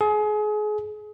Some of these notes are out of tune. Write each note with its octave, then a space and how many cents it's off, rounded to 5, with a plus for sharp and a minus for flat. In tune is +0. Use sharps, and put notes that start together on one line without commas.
G#4 +30